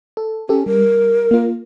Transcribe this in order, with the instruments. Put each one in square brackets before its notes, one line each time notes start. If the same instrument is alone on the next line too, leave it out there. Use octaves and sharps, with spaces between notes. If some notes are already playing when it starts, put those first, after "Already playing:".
[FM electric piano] A4
[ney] C#4 [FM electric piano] G4 A4
[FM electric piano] G3 [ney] A#4
[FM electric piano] A#3 F4